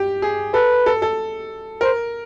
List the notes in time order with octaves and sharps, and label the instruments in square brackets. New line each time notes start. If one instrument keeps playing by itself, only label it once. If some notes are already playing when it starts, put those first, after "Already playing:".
Already playing: [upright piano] G4
G#4
[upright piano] A4 [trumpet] B4
[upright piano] A4
A4
[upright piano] A#4 [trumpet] C5